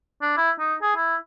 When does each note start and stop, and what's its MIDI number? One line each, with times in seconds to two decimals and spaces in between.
0.22 0.35 62
0.37 0.51 64
0.59 0.74 63
0.82 0.93 68
0.96 1.16 64